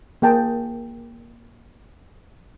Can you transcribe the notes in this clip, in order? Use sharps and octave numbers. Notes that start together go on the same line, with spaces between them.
A#3 G#4 G5 A5